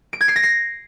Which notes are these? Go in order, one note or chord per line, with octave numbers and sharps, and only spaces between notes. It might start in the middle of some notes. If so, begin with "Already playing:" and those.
D7
G#6
C7
A#6
C7